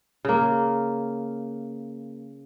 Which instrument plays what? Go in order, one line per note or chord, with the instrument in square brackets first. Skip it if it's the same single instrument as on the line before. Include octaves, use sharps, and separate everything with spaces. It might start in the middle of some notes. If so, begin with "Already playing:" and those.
[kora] C#3 A#3